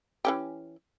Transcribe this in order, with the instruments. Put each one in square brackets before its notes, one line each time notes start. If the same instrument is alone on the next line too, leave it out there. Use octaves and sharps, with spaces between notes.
[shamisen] E3 C#4 G4